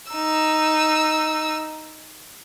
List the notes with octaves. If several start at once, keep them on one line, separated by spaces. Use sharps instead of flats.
D#4 E6